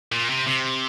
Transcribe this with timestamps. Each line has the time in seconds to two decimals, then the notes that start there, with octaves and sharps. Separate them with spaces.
0.12 A#2
0.30 C3
0.47 C3